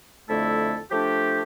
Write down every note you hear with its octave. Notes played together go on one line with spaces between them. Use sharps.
F2 D3 A3 E4 A4
F3 A3 D4 G4